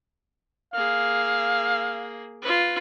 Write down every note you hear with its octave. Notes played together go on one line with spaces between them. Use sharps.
A#3 G#4 F5
F4 B4